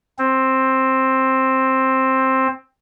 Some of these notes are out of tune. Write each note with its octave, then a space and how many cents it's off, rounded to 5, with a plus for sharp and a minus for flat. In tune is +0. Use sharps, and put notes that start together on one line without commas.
C4 +10